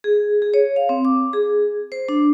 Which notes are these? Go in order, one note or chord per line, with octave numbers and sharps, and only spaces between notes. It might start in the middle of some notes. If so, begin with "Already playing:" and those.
G#4
G#4
C#5
F5
C4
D6
G#4
C5
D4